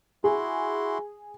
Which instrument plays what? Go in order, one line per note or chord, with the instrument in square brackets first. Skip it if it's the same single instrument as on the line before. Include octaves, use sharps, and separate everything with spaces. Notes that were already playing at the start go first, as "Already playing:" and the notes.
[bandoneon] E4 F#4 C6 [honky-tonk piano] G#4